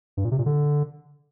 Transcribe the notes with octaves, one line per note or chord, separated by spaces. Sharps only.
G2
A#2
C3
A#2
D3